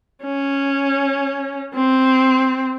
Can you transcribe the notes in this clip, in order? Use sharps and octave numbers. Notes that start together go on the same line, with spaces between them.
C#4
C4